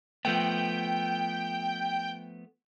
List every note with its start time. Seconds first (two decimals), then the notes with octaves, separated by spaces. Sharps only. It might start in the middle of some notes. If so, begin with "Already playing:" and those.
0.25 F3 A3 B3 G5